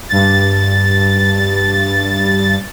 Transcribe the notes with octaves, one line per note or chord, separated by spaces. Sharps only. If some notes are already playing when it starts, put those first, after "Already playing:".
G2 A6